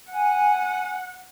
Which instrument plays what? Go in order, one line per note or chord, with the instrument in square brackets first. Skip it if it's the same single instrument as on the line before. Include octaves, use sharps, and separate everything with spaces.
[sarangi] F#5 [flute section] G#5